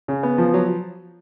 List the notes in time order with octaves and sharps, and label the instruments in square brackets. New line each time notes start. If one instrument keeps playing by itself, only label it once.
[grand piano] C#3
B3
F3
F#3